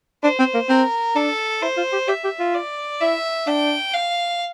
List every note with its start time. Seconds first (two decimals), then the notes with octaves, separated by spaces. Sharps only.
0.23 D4 C5
0.39 C4
0.54 A#3
0.69 C4 A#4
1.15 D4 A4
1.62 E4 C5
1.77 F4
1.92 G4
2.08 G4 E5
2.24 G4
2.39 F4
2.54 D5
3.01 E4 E5
3.47 D4 G5
3.93 F5